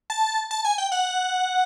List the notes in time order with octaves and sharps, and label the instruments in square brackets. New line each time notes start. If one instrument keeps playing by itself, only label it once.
[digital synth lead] A5
A5
G#5
G5
F#5